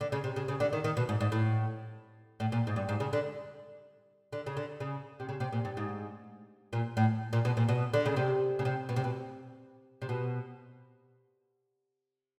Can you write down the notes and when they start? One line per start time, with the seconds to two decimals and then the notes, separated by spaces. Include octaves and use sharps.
0.01 D3
0.12 C#3
0.24 C3
0.36 C#3
0.48 C#3
0.60 D3
0.73 D#3
0.84 D#3
0.97 B2
1.09 G#2
1.21 G#2
1.32 A2
2.40 A2
2.52 A#2
2.67 G#2
2.76 G2
2.89 G#2
3.00 C#3
3.13 D3
4.33 D3
4.46 C#3
4.57 D3
4.80 C#3
5.20 C3
5.29 C#3
5.40 C3
5.52 A#2
5.65 G2
5.77 G#2
6.73 A#2
6.97 A2
7.33 A#2
7.45 B2
7.57 A#2
7.69 B2
7.94 D3
8.06 C#3
8.16 C3
8.59 C#3
8.65 C3
8.89 B2
8.96 C3
9.04 B2
10.02 C3
10.09 B2